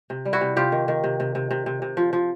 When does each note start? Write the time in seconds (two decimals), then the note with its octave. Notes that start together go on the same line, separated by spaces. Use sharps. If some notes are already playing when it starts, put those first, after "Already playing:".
0.10 C3
0.25 G3
0.33 E4 F#4
0.41 C3
0.56 C3 F4 G4
0.72 D#3
0.88 D#3
1.04 C3
1.20 C3
1.35 C3
1.51 C3
1.66 C3
1.82 C3
1.97 F3
2.13 F3